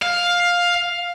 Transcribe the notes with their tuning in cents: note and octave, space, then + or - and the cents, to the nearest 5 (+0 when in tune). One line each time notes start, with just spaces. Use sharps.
F5 +10